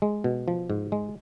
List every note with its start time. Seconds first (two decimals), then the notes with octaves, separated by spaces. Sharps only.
0.02 G#3
0.24 B2
0.48 F3
0.70 G#2
0.92 G#3